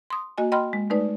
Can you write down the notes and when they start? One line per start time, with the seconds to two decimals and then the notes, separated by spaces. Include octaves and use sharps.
0.10 C6 D#6
0.38 A#3 F#4 D#5 G#5
0.52 D#5 G5 B5 C6 F6
0.73 G#3
0.90 G#3 A3 D#4 B4 D5